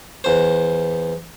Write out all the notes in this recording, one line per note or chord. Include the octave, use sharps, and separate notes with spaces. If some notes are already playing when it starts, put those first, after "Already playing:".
E2 C5